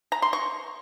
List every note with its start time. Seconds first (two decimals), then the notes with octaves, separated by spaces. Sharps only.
0.12 A#5
0.22 C6
0.33 C#6